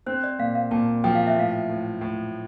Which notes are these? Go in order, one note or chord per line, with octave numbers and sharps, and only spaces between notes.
C4 C5
D5
A#2 F5
F5
A#2 A5
F3 G5
F5
E5
A2 F5
A2
A2